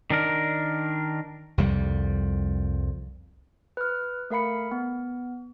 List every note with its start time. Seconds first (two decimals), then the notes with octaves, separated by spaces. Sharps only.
0.10 D#3 D4 A#4
1.58 C2 F2 G3
3.77 B4 F6
4.30 A3 A#4 F5 B5 C#7
4.71 B3